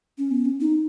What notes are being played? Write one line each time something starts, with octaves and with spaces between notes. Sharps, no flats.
C#4
B3
C#4
D#4